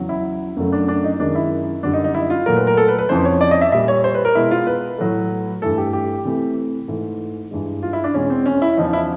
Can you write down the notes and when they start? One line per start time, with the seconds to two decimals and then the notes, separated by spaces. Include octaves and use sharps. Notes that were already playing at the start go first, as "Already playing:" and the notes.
Already playing: E2 C#3 F#3
0.09 E4
0.57 F#2 C#3 F#3 A3
0.72 D4
0.88 D4
1.04 D#4
1.20 F#2 D#3 G#3 D4
1.35 E4
1.83 F#2 D3 G3 D4
1.94 D#4
2.04 D#4
2.14 E4
2.30 F4
2.46 A#2 F#3 A3 A#4
2.56 B4
2.67 A#4
2.77 A4
2.88 B4
2.99 B4
3.09 F2 C#3 E3 C5
3.25 C#5
3.41 D5
3.51 D#5
3.61 E5
3.72 A#2 G3 E5
3.88 C#5
4.04 C5
4.15 B4
4.25 A#4
4.35 B2 G#3 E4
4.51 F4
4.67 B4
4.98 A2 F#3 A3
5.62 G2 E3 A3 A4
5.78 G4
5.93 G4
6.25 C3 E3 A3
6.88 G#2 E3 A3
7.51 G2 E3 G#3
7.83 F4
7.93 E4
8.04 D4
8.14 E2 B2 G#3 C#4
8.30 C4
8.46 C#4
8.62 E4
8.77 E2 C#3 F3 D#4
8.93 E4